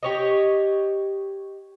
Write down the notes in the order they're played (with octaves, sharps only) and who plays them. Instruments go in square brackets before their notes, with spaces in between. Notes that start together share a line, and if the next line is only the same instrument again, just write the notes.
[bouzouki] G4 C#5 D#5